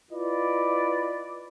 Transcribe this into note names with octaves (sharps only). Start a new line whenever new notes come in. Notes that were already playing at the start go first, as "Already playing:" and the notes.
E4 F4 B4 D5 D#5